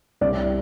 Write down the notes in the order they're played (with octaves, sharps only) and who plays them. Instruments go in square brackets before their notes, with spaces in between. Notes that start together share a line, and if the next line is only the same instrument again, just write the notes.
[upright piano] C2 D5